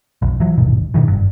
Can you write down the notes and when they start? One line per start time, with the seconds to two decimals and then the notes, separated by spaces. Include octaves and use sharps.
0.22 F1 B1
0.40 E3 F#3
0.58 D#1 G#1 G2 B2
0.94 G2 B2 D#3 E3
1.08 F#1 G2